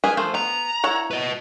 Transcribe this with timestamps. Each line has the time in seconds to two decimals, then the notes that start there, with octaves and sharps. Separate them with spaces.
0.04 A#3 G#4 B4
0.17 F3 A3 C5
0.35 B3 A#5
0.84 E4 C#5 F#5
1.11 B4 D#5